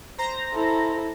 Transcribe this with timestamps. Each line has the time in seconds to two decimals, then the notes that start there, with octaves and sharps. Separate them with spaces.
0.18 C5 A#5 A#6
0.54 E4 A4